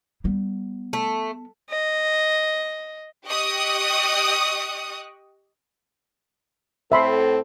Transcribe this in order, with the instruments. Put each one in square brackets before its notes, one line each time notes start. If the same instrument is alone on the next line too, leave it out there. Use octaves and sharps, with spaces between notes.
[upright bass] G3 B3
[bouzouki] A3
[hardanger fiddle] D#5
[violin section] G4 D#5 C#6 D#6 F#6
[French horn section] A2 C4 A4 [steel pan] E5 B5 C6